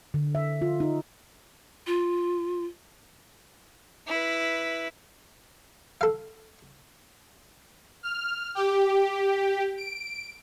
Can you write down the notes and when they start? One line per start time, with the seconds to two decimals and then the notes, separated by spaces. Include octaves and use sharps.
0.14 D3
0.35 E5
0.62 F4
0.80 D#4
1.87 F4
4.07 E4 B4
6.01 A4 F5
8.03 F6
8.55 G4
9.77 D7